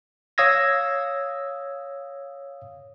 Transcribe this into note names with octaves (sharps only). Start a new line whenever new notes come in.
C#5 F5 D#6 E6 G#6 A#6